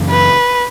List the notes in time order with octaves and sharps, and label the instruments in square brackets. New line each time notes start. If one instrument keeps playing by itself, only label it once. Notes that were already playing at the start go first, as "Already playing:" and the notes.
Already playing: [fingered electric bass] F#2 C#3 E3
[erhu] B4